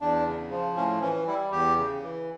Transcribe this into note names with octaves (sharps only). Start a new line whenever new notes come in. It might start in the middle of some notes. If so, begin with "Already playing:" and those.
E2 D4
C#3
F3
A2 C#4
E3 C#4
G3 E4
E2 G4
C#3
E3